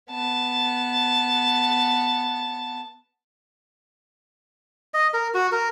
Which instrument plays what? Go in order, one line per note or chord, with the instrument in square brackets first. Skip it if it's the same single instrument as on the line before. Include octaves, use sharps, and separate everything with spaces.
[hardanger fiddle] B3 A5
[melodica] D#5
A#4
F#4
A#4